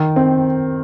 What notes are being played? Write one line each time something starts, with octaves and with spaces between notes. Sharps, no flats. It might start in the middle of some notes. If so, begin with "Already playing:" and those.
Already playing: D#3
C4